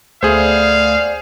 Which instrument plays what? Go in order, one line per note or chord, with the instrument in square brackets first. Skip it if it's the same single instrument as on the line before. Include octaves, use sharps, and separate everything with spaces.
[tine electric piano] D2 A3 G#6 [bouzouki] B3 D4 [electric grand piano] G#4 C5 [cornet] F5